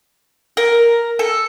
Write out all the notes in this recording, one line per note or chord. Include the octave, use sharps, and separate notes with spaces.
A#4
A4